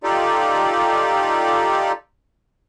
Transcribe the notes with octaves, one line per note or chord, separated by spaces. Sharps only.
D#4 F4 G4 A4 D5